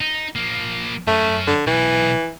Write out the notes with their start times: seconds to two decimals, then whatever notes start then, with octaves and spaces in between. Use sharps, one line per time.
0.01 D#4
0.36 F3 A#3
1.07 F#2 A3 C#4
1.47 D3
1.67 B1 E3